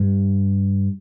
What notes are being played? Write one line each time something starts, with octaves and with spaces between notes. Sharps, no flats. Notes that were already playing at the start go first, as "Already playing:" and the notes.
Already playing: G2